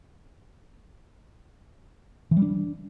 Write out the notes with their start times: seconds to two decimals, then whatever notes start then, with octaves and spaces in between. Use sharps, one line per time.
2.31 E3
2.37 G3
2.42 D4